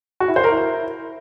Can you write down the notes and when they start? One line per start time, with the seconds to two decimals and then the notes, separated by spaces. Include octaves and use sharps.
0.20 F#4
0.28 E4
0.36 C5
0.44 A#4
0.52 E4